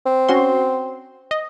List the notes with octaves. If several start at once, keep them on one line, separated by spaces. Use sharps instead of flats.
C4
C#4 F#4 C6
D#5